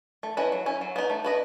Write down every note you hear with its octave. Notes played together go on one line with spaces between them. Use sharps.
A3
C#4 E4 B4 D#5
F#3
C#4 E4
F#3
B3 D#4
A3
E4 B4 D#5